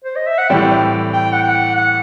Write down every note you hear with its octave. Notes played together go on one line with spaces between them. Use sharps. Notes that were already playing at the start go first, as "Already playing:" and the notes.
C5
D#5
E5
F#5
A2 E3 G3 C4 G5
G5
F#5
G5
F#5
F#5